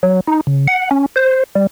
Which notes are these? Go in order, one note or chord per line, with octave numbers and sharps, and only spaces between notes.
F#3
D#4
C#3
F#5
C#4
C5
G3